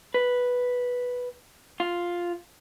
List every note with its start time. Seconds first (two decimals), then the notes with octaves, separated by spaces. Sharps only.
0.14 B4
1.80 F4